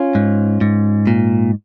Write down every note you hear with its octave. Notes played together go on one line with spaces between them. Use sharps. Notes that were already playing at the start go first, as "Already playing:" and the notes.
Already playing: C#4 F4
G#2
G#2
A#2